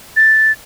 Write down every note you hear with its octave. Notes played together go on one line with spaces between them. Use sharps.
A6